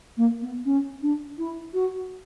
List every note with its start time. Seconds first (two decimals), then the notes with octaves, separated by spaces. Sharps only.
0.17 A#3
0.42 B3
0.65 C#4
1.02 D4
1.38 E4
1.74 F#4